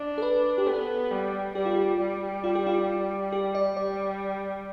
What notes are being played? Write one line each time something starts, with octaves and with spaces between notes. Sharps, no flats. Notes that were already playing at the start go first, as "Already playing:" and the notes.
Already playing: D4
A4
B4
G4
B3 A4
G3
G3 G4
F4
G4
G3
F4
G4
F4
G4
D5
G3 D5